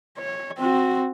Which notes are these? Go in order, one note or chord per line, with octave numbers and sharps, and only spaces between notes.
C#5
C4 F#4